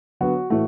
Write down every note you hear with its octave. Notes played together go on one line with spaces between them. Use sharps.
D3 F#3 B3 F#4
A2 E3 A3 F#4